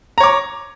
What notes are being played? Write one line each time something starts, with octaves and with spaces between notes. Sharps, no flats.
C#5 A#5 D6